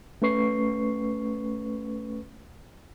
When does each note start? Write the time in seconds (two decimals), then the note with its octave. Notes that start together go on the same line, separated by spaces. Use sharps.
0.22 A3 C#4 B4 C#6 C7